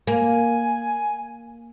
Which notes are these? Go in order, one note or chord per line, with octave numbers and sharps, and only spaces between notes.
A#3 G#5